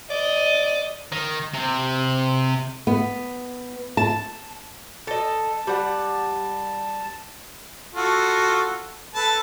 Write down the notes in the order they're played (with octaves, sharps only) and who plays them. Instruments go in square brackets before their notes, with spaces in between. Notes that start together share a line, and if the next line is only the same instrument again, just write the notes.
[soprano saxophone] D5 [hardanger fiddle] D#5
[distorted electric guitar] D#3
C3
[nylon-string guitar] B3
A5
[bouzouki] A4 D#5 [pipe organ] A5
[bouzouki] G3 F#5
[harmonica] F4 F#4 A4
A4 B4 A5